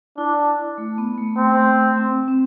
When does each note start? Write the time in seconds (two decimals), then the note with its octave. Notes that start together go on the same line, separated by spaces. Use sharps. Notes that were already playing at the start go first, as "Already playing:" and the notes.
0.18 D4 E4
0.78 A3
0.98 B3
1.18 A3
1.38 A3 C4
1.97 C4
2.28 C4